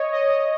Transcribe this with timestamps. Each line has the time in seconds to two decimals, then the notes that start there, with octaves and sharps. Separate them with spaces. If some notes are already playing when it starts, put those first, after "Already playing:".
Already playing: C#5 D#5
0.13 D#5
0.31 D#5